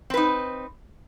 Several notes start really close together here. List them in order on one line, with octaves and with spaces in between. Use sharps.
C4 B4 D#4